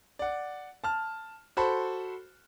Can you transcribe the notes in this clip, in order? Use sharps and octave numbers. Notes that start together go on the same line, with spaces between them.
D5 F#5
A5 F6
F#4 A4 C5 B5